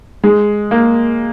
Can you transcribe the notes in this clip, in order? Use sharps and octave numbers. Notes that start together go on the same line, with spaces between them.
G#3
A#3